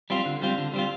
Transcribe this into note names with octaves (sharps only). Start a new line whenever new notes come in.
G3 C4 F4
D3
G3 C4 F4
D3
G3 C4 F4